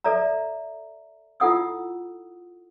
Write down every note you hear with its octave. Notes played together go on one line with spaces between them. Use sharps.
A4 D5 E5 A#5
E4 F4 A4 F#5 D#6 E6